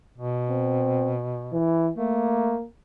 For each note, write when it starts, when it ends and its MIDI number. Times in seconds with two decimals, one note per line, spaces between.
0.18 1.57 47
0.50 1.13 60
1.53 1.90 52
1.98 2.56 57
1.98 2.66 58